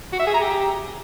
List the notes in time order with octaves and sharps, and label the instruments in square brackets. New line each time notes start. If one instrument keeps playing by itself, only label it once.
[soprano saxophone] F#4
E5
G#4
A#5
G4